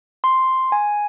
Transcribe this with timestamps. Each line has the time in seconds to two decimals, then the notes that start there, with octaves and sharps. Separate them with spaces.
0.24 C6
0.72 G#5